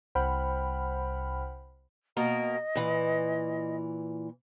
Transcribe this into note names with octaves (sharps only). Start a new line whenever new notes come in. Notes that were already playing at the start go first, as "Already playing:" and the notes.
C2 C5 F#5 G5 B5 F6
B2 A#3 A#4 D#5
A#2 E3